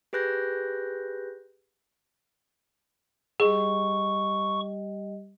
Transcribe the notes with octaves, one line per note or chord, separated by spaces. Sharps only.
G4 G#4 B4 F#6 G6 A#6
G3 G4 G#4 D#5 C#6